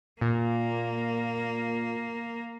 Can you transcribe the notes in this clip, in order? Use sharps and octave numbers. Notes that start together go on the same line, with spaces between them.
A#2 A#3